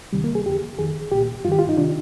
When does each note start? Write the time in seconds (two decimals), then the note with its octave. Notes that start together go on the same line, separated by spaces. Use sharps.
0.13 D2 C3 D#3 G3
0.24 A#3
0.35 G#4
0.46 F2 D3 G4
0.79 F2 D#3 G#4
1.12 C2 A#2 G4
1.44 G2 F4
1.48 D#3 G4
1.59 F4
1.69 D#4
1.78 C3 D#3 D4